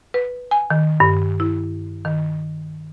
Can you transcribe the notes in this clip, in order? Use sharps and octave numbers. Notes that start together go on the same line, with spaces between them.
B4
G#5
D#3
G2
E4
D#3